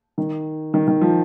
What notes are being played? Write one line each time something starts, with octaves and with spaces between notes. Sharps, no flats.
D#3
D#3
D#3
F3